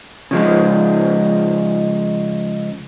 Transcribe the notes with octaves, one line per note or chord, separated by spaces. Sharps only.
C#3 F3 G#3